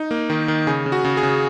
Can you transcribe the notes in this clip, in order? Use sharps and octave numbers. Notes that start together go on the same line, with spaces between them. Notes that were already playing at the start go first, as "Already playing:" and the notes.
Already playing: D#4
A#3
D#3
D#3
C#3 G#4
C#3
F#4
C#3
G#4
C#3